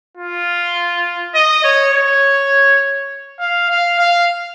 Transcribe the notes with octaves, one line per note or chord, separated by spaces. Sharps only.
F4
D#5
C#5
C#5
F5
F5
F5